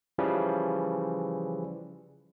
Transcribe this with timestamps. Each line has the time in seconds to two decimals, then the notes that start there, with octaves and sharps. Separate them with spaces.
0.18 C#3 E3 F3 G3